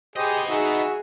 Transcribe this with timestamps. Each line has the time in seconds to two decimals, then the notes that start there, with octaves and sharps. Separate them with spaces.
0.16 B3 G4 G#4 C5 D#5 D#6
0.49 D#4 F#4 G#4 E5